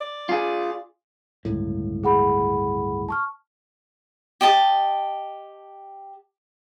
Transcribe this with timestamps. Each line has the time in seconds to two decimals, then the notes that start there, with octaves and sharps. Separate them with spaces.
0.01 D5
0.29 F4 G#4
1.45 G1 C#2 A2
2.03 G#4 F#5 B5
3.09 A5 C#6 F6
4.41 G4 D#5 A5